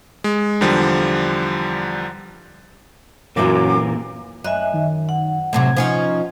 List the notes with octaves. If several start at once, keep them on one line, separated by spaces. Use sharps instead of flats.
G#3
E2 D3 F3 G3
F#2 A#2 E3 A#3 D6
F#2 D#5 E5 G#5 F#6
D#3
F#5
A2 C3 F#3 G#6
F3 C#4 D#4